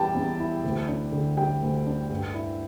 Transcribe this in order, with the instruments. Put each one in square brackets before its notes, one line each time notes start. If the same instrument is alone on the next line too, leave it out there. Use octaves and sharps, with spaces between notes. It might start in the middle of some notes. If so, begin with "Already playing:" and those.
Already playing: [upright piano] E2 E3 G3 E4 G5 A5
E2
E4
D2
D4
D3
G3 G5
D2
D4
G2
E4